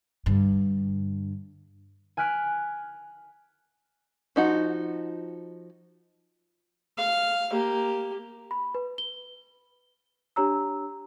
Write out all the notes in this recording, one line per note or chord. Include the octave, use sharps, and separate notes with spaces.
G2 D3
G#5 F6 F#6 B6 D7
F3 D#4 F#4
F5
A#3 G4
B5
B4
G7
D4 G4 C#5 A#5 E6